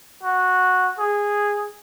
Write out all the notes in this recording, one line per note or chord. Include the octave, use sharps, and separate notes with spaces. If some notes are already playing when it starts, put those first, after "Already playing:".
F#4
G#4